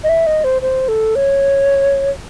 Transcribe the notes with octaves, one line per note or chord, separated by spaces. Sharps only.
D#5
E5
D#5
C5
C5
A4
C#5